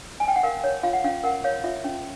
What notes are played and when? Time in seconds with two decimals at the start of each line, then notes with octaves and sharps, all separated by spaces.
0.20 G#5
0.28 G5
0.36 F#5
0.43 A#4 F5
0.64 C#5
0.83 F4 F5
0.93 F#5
1.04 C#4 F5
1.24 A#4 F#5
1.44 C#5 F5
1.64 F4 E5
1.84 C#4